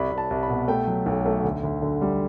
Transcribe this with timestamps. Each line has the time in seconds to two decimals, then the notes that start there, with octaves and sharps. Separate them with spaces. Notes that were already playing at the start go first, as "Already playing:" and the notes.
Already playing: C2 B5
0.11 C2
0.18 A5
0.30 C2
0.43 B5
0.49 B2
0.68 A3 G5
0.87 F#3
1.06 B1
1.26 A3
1.44 D2
1.63 D2
1.82 D3
2.01 G3